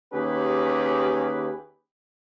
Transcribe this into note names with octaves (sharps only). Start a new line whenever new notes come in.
D#2 C#4 G4 G#4 B4